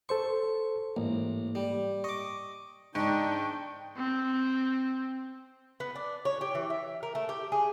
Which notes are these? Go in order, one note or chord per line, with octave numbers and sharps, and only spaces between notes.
A4 C5 C6 C#6
A1 G#2 A#3
G3
D#5 C#6 D6
G#2 D4 D#4 G5 C#6
C4
B3
D4
C#5
G4
E3
E5
A#4
A3
G4
G#4